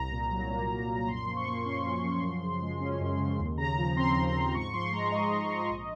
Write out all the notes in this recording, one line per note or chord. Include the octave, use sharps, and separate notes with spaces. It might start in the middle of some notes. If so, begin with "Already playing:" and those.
Already playing: C2 A#5
A#2
F#3
A#3
C2
A#2
A#5
F#2 C6
F3
C#6
A#3
C#4 C6
F#2
F3
F#2
C#3
G#3
C#4
F#2
C#3
D#2
C#3 A#5
F3 A#5
C4 C6
D#2
C6
C#3
G#2 C#6
F3 C6
G#3 A#5
G#2 D#5
G#2
F3
A#1